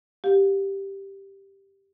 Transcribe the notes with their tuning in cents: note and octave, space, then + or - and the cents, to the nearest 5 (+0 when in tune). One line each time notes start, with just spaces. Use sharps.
G4 +0 F5 +30